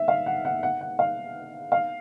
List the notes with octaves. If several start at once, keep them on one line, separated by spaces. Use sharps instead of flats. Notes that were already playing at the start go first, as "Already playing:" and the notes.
Already playing: E5
F5
F#5
F#5
F#5
F#5
F5
F5